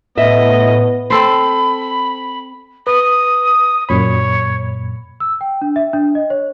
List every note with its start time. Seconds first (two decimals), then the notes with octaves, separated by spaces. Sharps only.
0.17 A2 B3 D#5 E5
1.10 C4 A4 C5 B5
2.87 B4 D#6
3.89 F#2 A#2 C#5 B5
5.20 E6
5.41 G5
5.62 D4
5.76 E5
5.93 D4
6.15 D#5
6.30 C#5